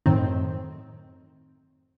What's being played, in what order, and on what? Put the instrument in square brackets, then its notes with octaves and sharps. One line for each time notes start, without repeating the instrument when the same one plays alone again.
[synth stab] F#2 A2 D#3 C4